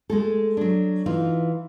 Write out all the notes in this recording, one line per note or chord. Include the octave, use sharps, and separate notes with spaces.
G#3 A3 A4
F#3 D4
E3 D#4 F4